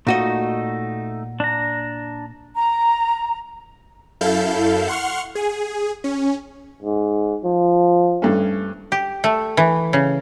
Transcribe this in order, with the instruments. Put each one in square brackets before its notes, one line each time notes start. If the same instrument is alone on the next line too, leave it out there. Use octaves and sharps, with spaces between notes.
[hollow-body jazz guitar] A#2 F#4 D#5 [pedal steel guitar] A3 D#4
[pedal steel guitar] D4 A#5
[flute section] A#5
[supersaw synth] F#2 E4 A4 F5 G6
F#5 C6 C#6 F6
G#4
C#4
[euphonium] G#2
F3
[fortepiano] G2 A3 C#4
[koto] G4
A3
E3
C#3